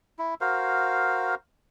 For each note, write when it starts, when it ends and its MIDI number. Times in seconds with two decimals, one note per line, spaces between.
0.19 0.34 64
0.41 1.35 66
0.41 1.35 70
0.41 1.35 72
0.41 1.35 77